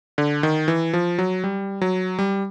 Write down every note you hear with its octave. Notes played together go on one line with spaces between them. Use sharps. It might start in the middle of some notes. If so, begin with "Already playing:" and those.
D3
D#3
E3
F3
F#3
G3
F#3
G3